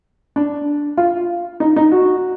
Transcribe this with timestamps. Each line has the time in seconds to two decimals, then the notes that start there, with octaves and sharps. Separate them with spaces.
0.36 D4
0.97 F4
1.60 D#4
1.76 D#4
1.92 F#4